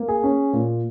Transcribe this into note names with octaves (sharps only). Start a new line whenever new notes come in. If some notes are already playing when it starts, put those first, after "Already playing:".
Already playing: A#3
G#4
C#4
A#2